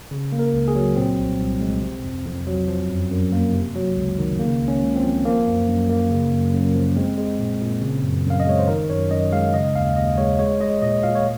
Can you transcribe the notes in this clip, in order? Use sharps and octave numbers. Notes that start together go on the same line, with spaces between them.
C#3
A#3
A#4
C#2
G#4
F#3
A#2 C4
C2
C2
G#3
C3
F2
F2
F#3
F3
F#2
F#2
A#3
C3
F#3
C#2
D#3
C#3 A#3
C#2
C#4
C#2
C4
F3
F3 A#3
F#2
F#2
A#3
C#3
F#2
F#2
F3
G#3 C4
G#3
A#2
A#2
C#3
F#2
F#2 F5
D#5
G#3 C#5
C5
D#3 A#4
F#2 C#5
F#2 D#5
G#3 F5
C#3 D#5
D#2 F5
D#2 D#5
G#3 C#5
G#3 C#5
G#3 D#5
A#2 D#5
A#2 F5
C#5